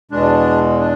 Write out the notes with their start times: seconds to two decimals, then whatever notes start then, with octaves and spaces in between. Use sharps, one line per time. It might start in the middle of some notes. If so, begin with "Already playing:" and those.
0.11 E2 B2 G#3 D4
0.80 D4